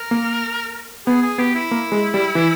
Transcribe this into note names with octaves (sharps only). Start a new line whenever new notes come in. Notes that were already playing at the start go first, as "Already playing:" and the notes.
Already playing: A#4
A#3
B3 G#4
G#4
B3 G4
E4
A#3
G#3
G3
E3